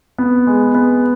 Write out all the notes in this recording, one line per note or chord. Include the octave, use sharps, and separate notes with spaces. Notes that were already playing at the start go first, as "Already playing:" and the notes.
B3
G#3
B3